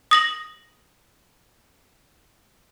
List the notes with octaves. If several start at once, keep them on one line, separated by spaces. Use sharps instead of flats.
D#6 A#6 F#7